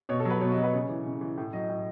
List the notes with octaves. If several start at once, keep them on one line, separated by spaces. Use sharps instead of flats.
B2 C#5
A4
F#3 B4
B2 C#5
D#5
F#3
B4
C#3 C#5
E3
C#3
E3
A2
F#3 D#5
A2